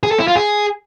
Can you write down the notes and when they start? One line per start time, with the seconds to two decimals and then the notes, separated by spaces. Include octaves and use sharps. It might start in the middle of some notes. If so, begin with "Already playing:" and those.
0.03 G#4
0.11 A4
0.19 E4
0.28 F4
0.36 G#4